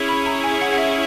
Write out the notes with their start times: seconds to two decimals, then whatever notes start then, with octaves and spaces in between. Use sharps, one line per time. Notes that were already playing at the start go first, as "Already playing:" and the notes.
Already playing: C#4 E4 G#4 C#5
0.09 B5
0.26 A#5
0.44 G#5
0.61 F#5
0.73 F#5
0.78 E5